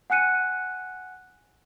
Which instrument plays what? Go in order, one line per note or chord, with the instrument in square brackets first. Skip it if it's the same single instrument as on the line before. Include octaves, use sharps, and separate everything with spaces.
[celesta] F#5 G#5 F#6 C#7 D#7